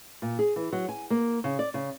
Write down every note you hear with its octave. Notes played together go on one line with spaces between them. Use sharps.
A#2
G#4
E3
F#3
G#5
A#3
C#3
D5
C#3